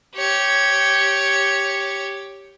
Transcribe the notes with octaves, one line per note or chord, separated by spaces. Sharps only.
G4 C#5